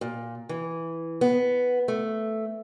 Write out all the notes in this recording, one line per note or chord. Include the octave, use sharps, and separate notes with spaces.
A#2
E3
B3
A3